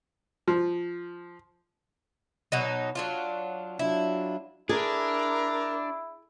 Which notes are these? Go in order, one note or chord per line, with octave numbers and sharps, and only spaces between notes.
F3
B2 F#3 D#4
F#3 D4 F4
F#3 D4 E4 F4
D4 E4 G#4 A#4